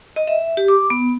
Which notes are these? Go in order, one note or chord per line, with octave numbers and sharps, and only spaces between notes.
D#5
E5
G4
D6
B3